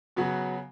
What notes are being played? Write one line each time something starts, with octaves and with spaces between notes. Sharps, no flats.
C#3 F#3 B3 F#4